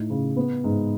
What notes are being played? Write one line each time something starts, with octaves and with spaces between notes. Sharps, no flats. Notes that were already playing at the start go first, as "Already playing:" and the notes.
Already playing: A2 D#4
C#3
B3
G#2